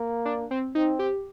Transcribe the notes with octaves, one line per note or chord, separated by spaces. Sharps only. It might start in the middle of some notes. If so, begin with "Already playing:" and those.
Already playing: A#3
D4
C4
C4 D#4
G4